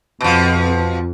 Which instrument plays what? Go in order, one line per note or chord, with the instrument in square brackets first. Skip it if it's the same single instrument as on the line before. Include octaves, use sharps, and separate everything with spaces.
[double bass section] F2 [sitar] B2 F3